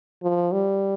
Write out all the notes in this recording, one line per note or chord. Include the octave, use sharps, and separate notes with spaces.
F3
G3